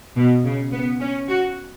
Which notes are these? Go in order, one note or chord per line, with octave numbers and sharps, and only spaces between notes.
B2
C#3
B3
C#4
F#4